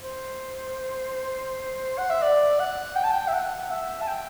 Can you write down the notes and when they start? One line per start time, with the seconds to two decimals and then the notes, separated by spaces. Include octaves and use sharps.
0.01 C5
1.98 F#5
2.10 E5
2.22 D5
2.60 F#5
2.96 G5
3.04 A5
3.11 G5
3.28 E5
3.33 F#5
3.71 E5
4.01 A5
4.07 G5